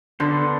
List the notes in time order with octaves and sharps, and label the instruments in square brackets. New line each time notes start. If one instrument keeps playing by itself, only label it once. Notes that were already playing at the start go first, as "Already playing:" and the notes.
[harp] D3 [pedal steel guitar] B3 D4 A4 C5